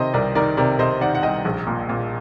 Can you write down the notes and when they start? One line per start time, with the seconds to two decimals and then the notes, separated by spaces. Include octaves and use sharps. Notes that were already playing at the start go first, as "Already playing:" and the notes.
Already playing: C3 D#3 C5 D#5
0.14 C2 A#4 D5
0.35 D#3 A#4 D5
0.57 C3 A#4 D5
0.79 C3 C5 D#5
1.01 D#3 D5 F#5
1.15 F#5
1.23 C2 D#5 G5
1.45 A#1
1.67 A#2
1.89 A#2